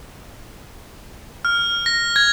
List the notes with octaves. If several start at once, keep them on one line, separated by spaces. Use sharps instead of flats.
F6
A#6
G#6